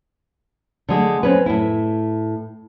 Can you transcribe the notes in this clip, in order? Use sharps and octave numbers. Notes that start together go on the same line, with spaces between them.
D3 G#3 A3
C4 C#4 B4
A2 E4